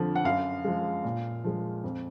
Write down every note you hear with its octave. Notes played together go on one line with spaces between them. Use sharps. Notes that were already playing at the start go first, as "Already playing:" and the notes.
Already playing: F2 D3 F3
F#5
F#2 F5
F3 G#3
A#2
F3 G#3
F2